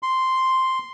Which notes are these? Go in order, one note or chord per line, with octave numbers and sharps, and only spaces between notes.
C6